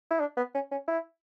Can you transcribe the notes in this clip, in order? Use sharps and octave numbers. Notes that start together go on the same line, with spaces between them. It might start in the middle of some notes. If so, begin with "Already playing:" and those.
E4
D4
B3
C#4
C#4
E4